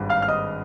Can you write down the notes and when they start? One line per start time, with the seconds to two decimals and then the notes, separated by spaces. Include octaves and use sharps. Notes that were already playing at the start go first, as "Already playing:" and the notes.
Already playing: G#1 G2 G3
0.10 F5 F6
0.22 F6
0.28 D#5 D#6